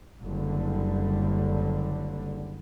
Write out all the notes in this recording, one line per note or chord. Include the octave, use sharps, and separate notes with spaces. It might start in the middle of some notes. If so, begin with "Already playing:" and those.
F#1 D3 G3